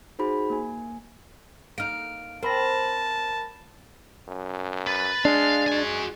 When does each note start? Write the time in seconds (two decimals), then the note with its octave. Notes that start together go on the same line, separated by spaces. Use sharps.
0.19 D#4 F#4 G#4 C5 B5
0.50 A#3 G#5
1.78 A#3 D#4 F6 D7
2.43 C4 A#4 A5 B5 A#6
4.29 F#2
4.87 B4 A6
5.25 G#3 D4 F5
5.68 G#3 F#4 G#5